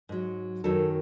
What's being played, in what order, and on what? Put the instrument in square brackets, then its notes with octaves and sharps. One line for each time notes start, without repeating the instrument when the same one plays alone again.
[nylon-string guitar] G#2 F#3
F#2 D#3 F#3 A4